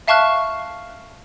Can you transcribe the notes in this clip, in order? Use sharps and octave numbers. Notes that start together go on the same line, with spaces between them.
E5 F5 A5 C#6 F6 F#6